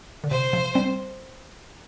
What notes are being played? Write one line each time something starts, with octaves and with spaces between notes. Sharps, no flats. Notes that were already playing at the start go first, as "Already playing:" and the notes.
D3
C3 C5
C3 F3
G3 C4